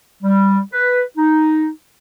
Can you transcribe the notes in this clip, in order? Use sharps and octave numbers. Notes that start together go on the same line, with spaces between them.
G3
B4
D#4